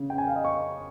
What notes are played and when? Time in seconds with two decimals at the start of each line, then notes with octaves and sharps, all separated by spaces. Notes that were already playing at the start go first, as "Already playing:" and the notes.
Already playing: C#3
0.10 G5
0.18 G#5
0.27 F5
0.36 D#5
0.45 C#6